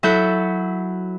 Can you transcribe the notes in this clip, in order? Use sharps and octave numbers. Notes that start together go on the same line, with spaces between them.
F#3 E4 F#4 A4 E5 G6